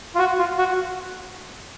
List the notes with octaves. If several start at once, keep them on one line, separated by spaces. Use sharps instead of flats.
F4
F#4
F4
F#4